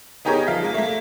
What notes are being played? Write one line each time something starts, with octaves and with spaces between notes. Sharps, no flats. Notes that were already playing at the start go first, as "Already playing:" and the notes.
B3 D#4 G4 G#4 A#4 C#5
F3 F5 B6
G#3 A#3
A3 A#3